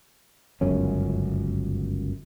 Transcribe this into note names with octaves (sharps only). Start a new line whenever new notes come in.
G1 C#2 F#2 C#4